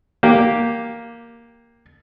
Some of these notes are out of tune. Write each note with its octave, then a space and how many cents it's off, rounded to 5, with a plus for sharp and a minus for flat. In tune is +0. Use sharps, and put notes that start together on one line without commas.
A#3 +0 G4 +0